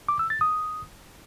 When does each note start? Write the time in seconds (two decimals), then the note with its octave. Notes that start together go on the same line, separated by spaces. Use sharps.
0.08 D6
0.19 E6
0.30 A6
0.41 D#6